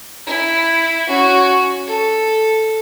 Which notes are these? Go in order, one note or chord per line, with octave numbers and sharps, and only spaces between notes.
E4
C#4 F#4
A4